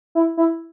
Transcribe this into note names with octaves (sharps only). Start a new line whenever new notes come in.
E4
E4